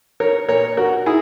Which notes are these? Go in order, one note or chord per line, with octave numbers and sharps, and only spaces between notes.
A#4 C#5
A#2 A#4 C#5
F#4 A#4
E4 G#4